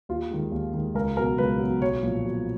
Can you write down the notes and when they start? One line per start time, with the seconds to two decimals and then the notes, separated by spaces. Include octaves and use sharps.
0.09 D#2 F4
0.30 D#3 G#3
0.52 D#2
0.74 D#3 G#3
0.95 C#2 A#4
1.17 B2 F#3 A#4
1.38 C#2 B4
1.59 B2 F#3
1.81 B1 C#5
2.03 A#2 F3
2.24 B1